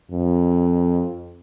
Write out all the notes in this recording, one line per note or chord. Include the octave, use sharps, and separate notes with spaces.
F2